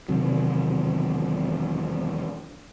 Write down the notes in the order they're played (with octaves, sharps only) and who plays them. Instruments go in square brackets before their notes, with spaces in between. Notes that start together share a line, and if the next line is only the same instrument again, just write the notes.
[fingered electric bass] E1 C3 D#3 F#3